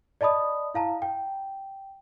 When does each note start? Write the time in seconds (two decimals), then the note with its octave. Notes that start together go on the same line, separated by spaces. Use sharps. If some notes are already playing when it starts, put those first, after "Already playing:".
0.21 D5 D#5 A5 B5 D#6
0.74 E4 F5 A5 A#5
1.02 G5